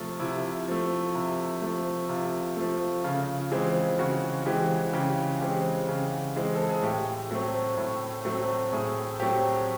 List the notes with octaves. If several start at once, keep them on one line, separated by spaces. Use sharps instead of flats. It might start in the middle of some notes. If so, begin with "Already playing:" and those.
Already playing: C3 F3 A3 F4
C3 E4
F3 A3
C3
F3 A3
C3 F4
F3 A3
C#3 F4
E3 G#3 C4
C#3 F#4
E3 G#3 C4 G4
C#3 G4
E3 G#3 C4 G4
C#3
E3 G#3 C4
A4
G#4
A2 G4
F#3 A3 C4
A2
F#3 A3 C4
A2 G#4
F#3 A3 C4 G4